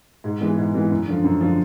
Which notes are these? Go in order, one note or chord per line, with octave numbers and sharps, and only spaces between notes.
G#2
E3 G#3 B3
G#2
E3 G#3 B3
F#2
D3 F3
F#2
D3 F3